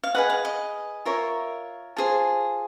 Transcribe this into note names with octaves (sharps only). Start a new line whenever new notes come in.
F5
G#4 B4 D#5 F#5
F5
D#5
F4 A#4 C#5 E5
F4 G#4 C5 A5